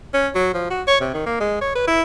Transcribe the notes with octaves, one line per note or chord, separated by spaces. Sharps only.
C#4
F#3
F3
F#4
C#5
C3
D#3
A#3
G#3
C#5
B4
E4